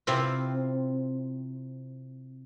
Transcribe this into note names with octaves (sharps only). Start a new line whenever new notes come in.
C3 C4 E4 F4